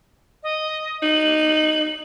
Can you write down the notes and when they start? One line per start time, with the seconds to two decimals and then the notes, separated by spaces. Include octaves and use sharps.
0.43 D#5
1.02 D#4 F#7